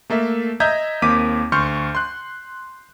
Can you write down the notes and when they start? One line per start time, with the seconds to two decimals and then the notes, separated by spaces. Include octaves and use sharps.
0.10 A3 A#3 A4 E5
0.60 D#5 E5 A#5 G6 G#6
1.02 D#2 A#3 C4 D6 B6 D#7
1.52 D2 C6 C#6 F6 G6 C#7
1.95 C6 F#6